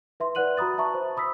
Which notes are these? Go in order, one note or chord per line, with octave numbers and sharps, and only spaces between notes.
B4 E5 C6
B4 D5 F#5 F#6 D#7 F#7
F#4 A#5 B5 D#6 A6
E5 A5 A#5 C#6
C5
B5 D#6 E6 B6